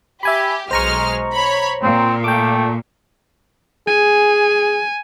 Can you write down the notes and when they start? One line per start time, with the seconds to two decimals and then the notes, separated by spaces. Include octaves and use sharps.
0.23 G4 E5 G#5 B5
0.71 B1 G#3 C5 A#5 C#6 F6
1.33 C#5 B5
1.83 A#2 C4
2.24 A3 G5 D6
3.87 G#4 G#5